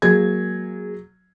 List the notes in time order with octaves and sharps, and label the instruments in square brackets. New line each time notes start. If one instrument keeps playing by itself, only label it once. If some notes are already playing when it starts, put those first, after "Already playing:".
[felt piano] F#3 G#6 [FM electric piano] G#3 A#3 G#4